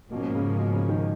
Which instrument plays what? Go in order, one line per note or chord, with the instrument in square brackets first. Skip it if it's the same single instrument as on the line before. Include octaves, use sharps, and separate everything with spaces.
[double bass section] G#2 F3 A#3 C#4 [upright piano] B2
[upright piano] C#3
B2
C#3
D#3